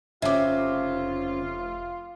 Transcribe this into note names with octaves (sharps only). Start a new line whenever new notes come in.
F1 C#3 C4 F4 E5 D6